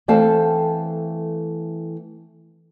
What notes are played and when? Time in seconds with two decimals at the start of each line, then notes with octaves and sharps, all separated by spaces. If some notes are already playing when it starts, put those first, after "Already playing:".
0.08 E3 A3 C4 A4 F5 A5